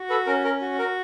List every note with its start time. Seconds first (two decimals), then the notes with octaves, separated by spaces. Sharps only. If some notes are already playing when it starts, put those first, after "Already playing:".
Already playing: F#4
0.10 A4 B4
0.27 C#4 A#4
0.44 A#4
0.61 F#4
0.79 A#4